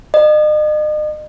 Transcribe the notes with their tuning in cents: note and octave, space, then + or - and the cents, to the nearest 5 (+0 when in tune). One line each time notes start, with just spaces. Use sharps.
D#5 -40